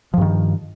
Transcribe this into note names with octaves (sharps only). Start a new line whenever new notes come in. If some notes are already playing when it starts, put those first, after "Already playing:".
G2 D#3 F3